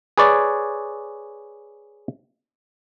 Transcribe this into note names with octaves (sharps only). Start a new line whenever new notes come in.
G#4 B4 C#5 D5